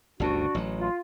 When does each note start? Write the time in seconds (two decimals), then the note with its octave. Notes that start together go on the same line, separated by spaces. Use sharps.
0.20 G1 D2 C#3 D4 F#4
0.55 A1 F#3
0.79 F4